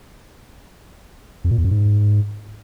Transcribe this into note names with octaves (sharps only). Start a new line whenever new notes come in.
F2
A#2
E2
F#2
G#2